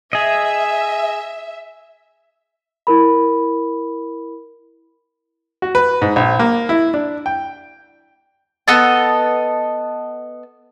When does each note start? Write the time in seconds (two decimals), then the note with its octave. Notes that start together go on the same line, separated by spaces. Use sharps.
0.13 G#4 D#5 E5
2.87 E4 A#4 B5
5.62 F#4
5.75 B4
6.02 G#2
6.16 A#1
6.39 A#3
6.69 E4
6.94 D4
7.26 G5
8.68 B3 A4 D#5 A5